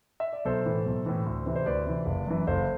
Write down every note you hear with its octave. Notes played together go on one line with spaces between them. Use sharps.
E5
D5
B1 A4 C5
A2 E3
B1
A2 E3
D2
C3 E3
C5
D2 B4 D5
C3 E3
F#1
F#2 E3
F#1 A4 C5